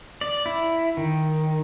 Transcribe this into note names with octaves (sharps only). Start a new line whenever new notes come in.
D5
E4
D#3